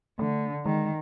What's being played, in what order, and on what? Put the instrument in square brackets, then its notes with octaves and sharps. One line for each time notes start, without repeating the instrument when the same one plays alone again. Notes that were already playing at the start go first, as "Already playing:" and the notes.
[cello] D3 [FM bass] A3
[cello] D#3 [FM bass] G#3